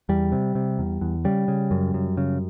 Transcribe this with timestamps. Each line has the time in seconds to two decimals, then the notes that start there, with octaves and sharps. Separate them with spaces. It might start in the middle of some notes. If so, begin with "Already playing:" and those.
0.09 E2 G3
0.32 C3
0.55 C3
0.79 E2
1.01 E2
1.25 C#3 G3
1.48 C#3
1.71 F#2
1.94 F#2
2.17 C#3